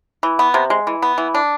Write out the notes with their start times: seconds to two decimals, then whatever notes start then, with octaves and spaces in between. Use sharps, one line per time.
0.23 E3
0.39 B3
0.54 C3
0.70 G#3
0.87 E3
1.02 B3
1.18 E3
1.34 D4